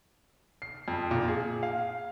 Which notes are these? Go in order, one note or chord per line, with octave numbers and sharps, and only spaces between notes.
C7
F2
A#2
G#4
F5